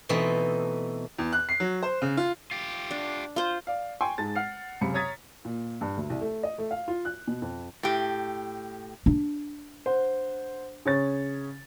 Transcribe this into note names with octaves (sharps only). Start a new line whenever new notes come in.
B2 E3 A3 C4 D#4 A4
E2
F#6
C7
F#3
C5
C#3
F4
F4 G4
D4
F4 C5
D5 F5
G5 G#5 C6 C#6
G#2 G#3 A5 A6
F#5 F6 C7
C#2 F#2 C3 B5 C#7
C#5 A#5 D#6 G#6 A6 B6
A#2
G2
D2
C2
A3
D#5
A3
F5
F4
F#6
B2
F2
A2 G4
D4
C5 F#5
C#3 C#5 A6